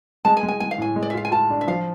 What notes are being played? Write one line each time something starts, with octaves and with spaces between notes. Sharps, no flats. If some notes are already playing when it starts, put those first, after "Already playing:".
G#3 A5
G#5
G#3
G#5
G#3 G#5
F5
A2 G#5
G#3
D5
E5
F4 F5
G#5
F4 A5
D4
E5
F3 F5